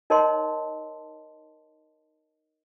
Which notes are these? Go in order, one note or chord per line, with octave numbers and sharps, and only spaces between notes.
D#4 A#4 C#5 D#5 A5 C6